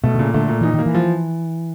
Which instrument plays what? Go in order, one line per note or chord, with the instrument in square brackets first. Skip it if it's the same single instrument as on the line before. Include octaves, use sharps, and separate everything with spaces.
[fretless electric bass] B2 [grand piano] A3
[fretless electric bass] D3
[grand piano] A#2 [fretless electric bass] C#3
[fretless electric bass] D3 [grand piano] A3
[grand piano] A#2
[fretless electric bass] E3 [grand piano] D#4
[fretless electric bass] D#3 [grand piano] A#3
[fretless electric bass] E3
[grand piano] F3